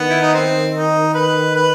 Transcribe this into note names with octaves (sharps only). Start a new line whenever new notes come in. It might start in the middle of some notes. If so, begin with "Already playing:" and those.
Already playing: D#3 B3
E4
D#4
C4
D#4
B4
B4